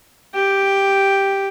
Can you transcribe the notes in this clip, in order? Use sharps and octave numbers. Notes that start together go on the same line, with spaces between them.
G4 G5